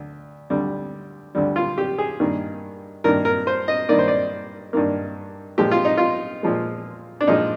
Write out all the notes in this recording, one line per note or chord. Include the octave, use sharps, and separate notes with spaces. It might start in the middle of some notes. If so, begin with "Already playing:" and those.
Already playing: D2
D2 D3 G3
D2 D3 G3
F4
G4
G#4
G2 D#3 A#3
G2 D#3 A#3 A#4
A#4
C5
D#5
G2 D#3 A#3 D5
C5
D5
G2 D#3 A#3
A#2 F3 G#3 G4
F4
D#4
F4
A#2 F3 G#3
D4
A#2 F3 G#3 D#4